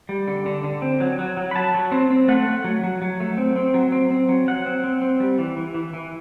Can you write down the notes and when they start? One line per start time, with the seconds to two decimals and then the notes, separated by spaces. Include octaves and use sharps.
0.09 G3
0.28 D3
0.46 D3
0.64 D3
0.82 C4
1.00 F#3
1.19 F#3
1.37 F#3
1.51 B5
1.55 F#3 A5
1.74 F#3
1.92 C4
2.10 C4
2.28 A3 F#5
2.46 A3
2.64 F#3
2.83 F#3
3.02 F#3
3.20 A3
3.38 C4
3.56 C4
3.74 F#3
3.92 C4
4.11 C4
4.29 F#3
4.47 F#3 F#5
4.66 C4
4.84 C4
5.02 C4
5.20 G3
5.39 E3
5.57 E3
5.74 E3
5.94 E3